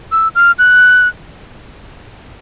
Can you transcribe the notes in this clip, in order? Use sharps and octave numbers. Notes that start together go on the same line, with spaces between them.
E6
F6
F#6